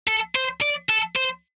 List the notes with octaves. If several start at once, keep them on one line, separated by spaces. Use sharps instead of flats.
A4
C5
D5
A4
C5